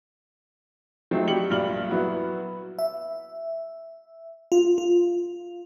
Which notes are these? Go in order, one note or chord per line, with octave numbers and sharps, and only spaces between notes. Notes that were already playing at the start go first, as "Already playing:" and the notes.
F#3 A3 C4 D#4 F4
F#3 G3 G4 C#7 F#7
C2 G2 A#2 D5 F6 F#7
F#3 B3 E4 F#4
E5
F4
F4